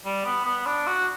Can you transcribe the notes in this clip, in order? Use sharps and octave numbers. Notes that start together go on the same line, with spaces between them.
G3
B3
B3
D4
F#4